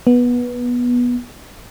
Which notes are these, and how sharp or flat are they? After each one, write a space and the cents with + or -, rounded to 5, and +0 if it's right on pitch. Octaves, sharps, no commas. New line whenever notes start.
B3 -15